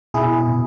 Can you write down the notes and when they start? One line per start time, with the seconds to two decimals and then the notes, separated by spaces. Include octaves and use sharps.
0.14 B2 E4 G#4
0.48 B2